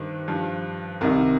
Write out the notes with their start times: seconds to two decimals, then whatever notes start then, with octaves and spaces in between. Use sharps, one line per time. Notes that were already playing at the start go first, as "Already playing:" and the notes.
Already playing: G2 D#3 C5
0.28 G2 F3
1.01 C2 C3 D#3 A#4